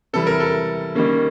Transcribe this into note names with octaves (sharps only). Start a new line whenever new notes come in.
C3 E3 G3 A4
A#4
A4
D#3 G3 A#3 C#4